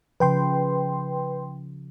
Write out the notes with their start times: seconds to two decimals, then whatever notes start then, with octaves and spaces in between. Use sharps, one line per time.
0.20 C#3 F3 B4 G5 C6